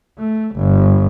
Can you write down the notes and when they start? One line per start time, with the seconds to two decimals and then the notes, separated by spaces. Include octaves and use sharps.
0.19 A3
0.55 G1